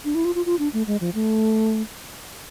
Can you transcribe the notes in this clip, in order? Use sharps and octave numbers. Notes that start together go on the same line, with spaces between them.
D4
E4
F4
F4
F4
D4
A3
G#3
F3
A3